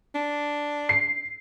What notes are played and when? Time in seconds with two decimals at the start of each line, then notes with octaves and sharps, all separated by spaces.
0.15 D4
0.89 C7